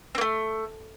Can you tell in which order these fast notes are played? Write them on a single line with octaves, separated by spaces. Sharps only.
C4 A#3 A3